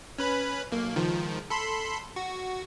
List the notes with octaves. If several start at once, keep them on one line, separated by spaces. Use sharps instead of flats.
C#4 B4 B5
B1 A#3
C#2 D#3 F3
A4 B5 C6
F#4